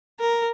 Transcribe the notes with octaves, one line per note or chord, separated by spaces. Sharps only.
A#4